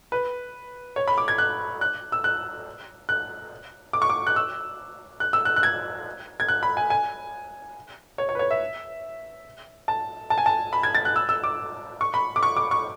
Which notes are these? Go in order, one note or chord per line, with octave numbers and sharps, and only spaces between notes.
B4
C#5
B5
D6
G#6
F#6
F#6
E6
F#6
F#6
D6
C#6
D6
F#6
E6
F#6
E6
F#6
F#6
G#6
G#6
F#6
B5
G#5
G#5
C#5
C#5
B4
C#5
E5
A5
A5
G#5
A5
B5
G#6
A6
F#6
E6
E6
D6
C#6
B5
D6
C#6
D6
C#6